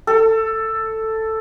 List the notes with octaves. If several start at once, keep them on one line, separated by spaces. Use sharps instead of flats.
A4